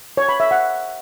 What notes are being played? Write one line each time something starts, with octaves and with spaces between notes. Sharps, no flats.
C#5
B5
E5
F#5